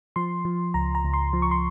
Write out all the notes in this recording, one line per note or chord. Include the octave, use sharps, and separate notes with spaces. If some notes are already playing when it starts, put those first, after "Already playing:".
F3 C6
F3
C#2 A#5
A#5
C#2
C6
F3
C#6
C6